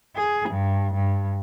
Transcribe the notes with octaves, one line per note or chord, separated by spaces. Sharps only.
G#4
G2
G2